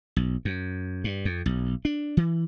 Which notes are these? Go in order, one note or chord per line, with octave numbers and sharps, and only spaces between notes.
B1
F#2
G2
F2
B1
D4
E3